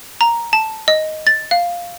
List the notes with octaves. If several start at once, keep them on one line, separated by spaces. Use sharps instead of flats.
A#5
A5
D#5
A6
F5